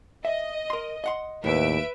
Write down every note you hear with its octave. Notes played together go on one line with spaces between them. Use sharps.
D#5 E5
A#4 C6
D#5 F#5 C6
D#2 A2 B4 E5 D7